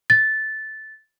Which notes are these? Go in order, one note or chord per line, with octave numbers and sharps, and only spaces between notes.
A6